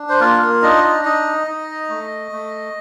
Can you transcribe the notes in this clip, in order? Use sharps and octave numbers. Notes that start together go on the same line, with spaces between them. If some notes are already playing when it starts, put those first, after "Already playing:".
Already playing: D4
C5
A#3 F4 A#4
A#3 A#4
D4 D#4 D#5
D#4 D#5
D#4 D#5
D#4
A3
A3